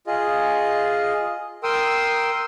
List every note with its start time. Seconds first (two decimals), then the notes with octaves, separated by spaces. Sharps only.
0.07 F4 G#4 D#5
1.63 A#4 G5 C6 D#6 E6